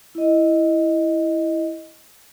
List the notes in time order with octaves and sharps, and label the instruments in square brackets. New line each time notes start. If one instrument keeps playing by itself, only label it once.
[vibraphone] E4 D#5